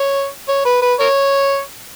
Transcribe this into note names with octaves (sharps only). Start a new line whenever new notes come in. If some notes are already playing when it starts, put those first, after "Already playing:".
Already playing: C#5
C#5
B4
B4
A#4 C#5